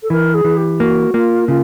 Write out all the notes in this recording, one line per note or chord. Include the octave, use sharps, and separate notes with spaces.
A4
E3 A#4
G#4
E3
G4
A#3 F#4
A#3 F4
C#3 F4